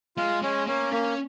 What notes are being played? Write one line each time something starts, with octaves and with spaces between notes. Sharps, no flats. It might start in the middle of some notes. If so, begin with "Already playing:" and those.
G#3 F4
G#3 C#4
A#3 C#4
A#3 C#4